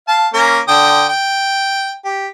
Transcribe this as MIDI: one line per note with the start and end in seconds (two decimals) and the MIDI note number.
0.08 0.28 77
0.08 0.28 81
0.34 0.60 58
0.34 0.60 61
0.34 0.60 70
0.68 1.07 50
0.68 1.07 79
0.68 1.07 87
1.09 1.95 79
2.04 2.27 67